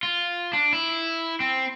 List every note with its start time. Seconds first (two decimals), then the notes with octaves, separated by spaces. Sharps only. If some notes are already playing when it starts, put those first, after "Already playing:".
0.03 F4
0.53 D4
0.73 E4
1.40 C4